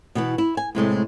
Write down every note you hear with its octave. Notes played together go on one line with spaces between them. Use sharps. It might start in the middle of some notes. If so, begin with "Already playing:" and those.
B2 E3 B3
E4
G#5
A2 C3 G#3 A3